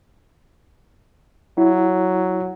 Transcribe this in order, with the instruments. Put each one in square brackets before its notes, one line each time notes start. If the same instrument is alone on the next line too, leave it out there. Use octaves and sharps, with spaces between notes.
[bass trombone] F#3 [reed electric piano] E4